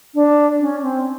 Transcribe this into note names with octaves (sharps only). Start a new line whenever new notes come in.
D4
C#4
C4